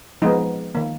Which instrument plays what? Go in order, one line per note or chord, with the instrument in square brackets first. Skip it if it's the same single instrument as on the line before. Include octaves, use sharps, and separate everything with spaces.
[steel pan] F3 G#3 B3 D#4
D#3 A#3